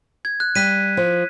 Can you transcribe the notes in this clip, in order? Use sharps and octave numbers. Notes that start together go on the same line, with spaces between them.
G#6
F#6
G3 F#6 B6 D#7
F3